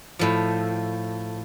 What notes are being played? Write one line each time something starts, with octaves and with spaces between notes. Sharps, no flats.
A2 F3